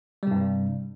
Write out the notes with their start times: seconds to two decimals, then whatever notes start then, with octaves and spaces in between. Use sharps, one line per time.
0.23 G3
0.27 C3
0.31 G2